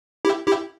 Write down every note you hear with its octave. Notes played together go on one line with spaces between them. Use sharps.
E4 G4
E4 G4